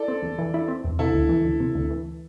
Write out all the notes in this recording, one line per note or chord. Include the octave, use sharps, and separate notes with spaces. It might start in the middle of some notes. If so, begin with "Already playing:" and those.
Already playing: E4 A4 D5
C4
E2
E3
E4
C4
E2
C3 E4 A4
D2
E3
D2
C3
D2
E3